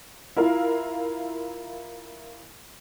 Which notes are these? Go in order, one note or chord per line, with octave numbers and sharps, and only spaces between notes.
E4 F4 A#4 F5